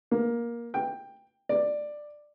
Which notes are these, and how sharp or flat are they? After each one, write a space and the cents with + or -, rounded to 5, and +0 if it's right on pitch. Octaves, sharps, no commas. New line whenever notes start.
A#3 +15
G5 +10
D5 +10